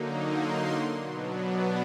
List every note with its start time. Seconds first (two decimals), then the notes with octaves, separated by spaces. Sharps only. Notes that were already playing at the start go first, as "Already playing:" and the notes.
Already playing: D3 F#3 A#3 D#4
0.31 C6
1.02 B2 F#3 B3 D4